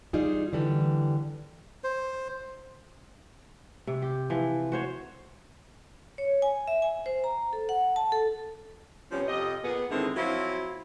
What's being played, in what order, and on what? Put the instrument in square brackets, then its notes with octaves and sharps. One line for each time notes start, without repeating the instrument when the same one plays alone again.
[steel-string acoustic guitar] G3 D#4 F4 G#4
D3 E3 G3 D4
[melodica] C5
[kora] C3
G4
E3 F3
F#4 C5 C#5
[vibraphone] C#5
G#5
E5
G#5
C5
A#5
A4
F#5
A5
A4
[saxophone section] C3 F3 G3 B3 C#4
F2 C3 G4 D#5
A#2 B3 G#4
G#2 D3 D#3 G#3 C4 E4
F3 F#3 C4 E4 F4